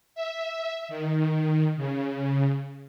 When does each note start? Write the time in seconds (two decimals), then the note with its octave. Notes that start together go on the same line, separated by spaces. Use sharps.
0.15 E5
0.89 D#3
1.77 C#3